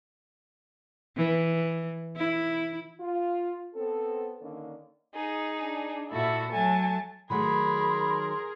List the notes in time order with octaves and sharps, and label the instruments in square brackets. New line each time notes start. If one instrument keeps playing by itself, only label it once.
[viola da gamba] E3
E4
[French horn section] F4
B3 C4 A4
D3 D#3 A#3 C#4 D4
[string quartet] D#4 G#4
[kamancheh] D4
[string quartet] A#2 F#4 A4 [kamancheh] E4 E5
[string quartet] F#3 A5 [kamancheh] A3 G#5
[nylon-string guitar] D#3 F#3 A3 [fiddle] G#4 A#4 [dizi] B5 [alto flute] C6